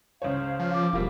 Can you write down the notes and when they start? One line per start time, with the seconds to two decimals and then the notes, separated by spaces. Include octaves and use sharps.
0.22 C#2 C5 C#5 F5
0.60 F3 F5
0.73 D6
0.93 E1 G3 A#3 F4